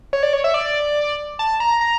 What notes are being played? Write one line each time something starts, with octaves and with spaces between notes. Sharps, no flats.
C#5
D5
C#5
E5
D5
A5
A#5
A#5